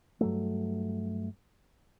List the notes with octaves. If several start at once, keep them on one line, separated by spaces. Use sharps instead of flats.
G2 F#3 A3